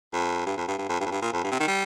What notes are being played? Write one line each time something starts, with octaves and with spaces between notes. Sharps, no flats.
F2
G2
F2
G2
G2
F2
G2
F2
G2
A#2
F2
G2
C3
D#3
G3